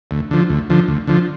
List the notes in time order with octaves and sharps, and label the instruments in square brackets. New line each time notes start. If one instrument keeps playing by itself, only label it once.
[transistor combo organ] D2
D3 F3
D2
D3 F3
D2
D3 F3